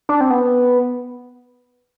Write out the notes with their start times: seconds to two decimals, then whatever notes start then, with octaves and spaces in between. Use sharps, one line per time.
0.09 D4
0.21 C4
0.30 B3